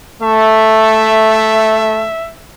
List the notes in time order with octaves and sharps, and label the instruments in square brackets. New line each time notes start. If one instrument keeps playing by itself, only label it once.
[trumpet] A3 [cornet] E5